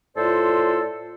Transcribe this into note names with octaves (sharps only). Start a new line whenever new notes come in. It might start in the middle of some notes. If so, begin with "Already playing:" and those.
A2 F4 A4 C5 D5